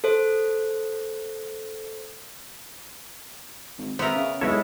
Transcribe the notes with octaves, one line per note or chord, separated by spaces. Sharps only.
A4 C5
G#1
G#1 B3 A#4 C5 E5
C#3
B1 G#3 E4 A4 B4 C#5